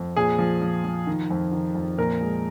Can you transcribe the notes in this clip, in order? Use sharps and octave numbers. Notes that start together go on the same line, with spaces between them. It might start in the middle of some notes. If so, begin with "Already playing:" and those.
Already playing: F2
A#2 G#4
F3
F3
F3
D#3
F2
D#3
F2
A#2 A#4
G#3